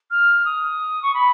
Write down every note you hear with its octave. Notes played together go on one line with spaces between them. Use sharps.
F6
D#6
C#6
B5